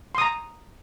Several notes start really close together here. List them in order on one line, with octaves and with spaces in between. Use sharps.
C6 D#6 A#5